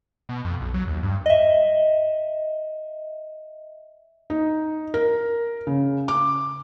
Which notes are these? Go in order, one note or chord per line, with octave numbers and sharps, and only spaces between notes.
B2
F2
B1
F#3
D#2
G2
D#5 E5
D#4
A#4
C#3
D6